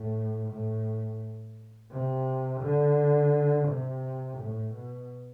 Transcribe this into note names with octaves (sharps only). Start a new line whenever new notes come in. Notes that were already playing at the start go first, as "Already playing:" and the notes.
Already playing: A2
A2
C3
D3
C3
A2
B2